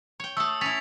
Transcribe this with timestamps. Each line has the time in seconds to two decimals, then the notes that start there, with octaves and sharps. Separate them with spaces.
0.20 C#5 G5
0.37 A3 A4 D#6 E6
0.61 C#4 E4 A6 B6 F7